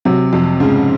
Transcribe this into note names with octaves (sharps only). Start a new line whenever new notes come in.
C3 F#3
F2 C3
G#2 C#3